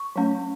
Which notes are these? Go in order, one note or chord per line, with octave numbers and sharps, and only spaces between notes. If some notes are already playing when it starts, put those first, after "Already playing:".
Already playing: C#6
F#3 A3 C#4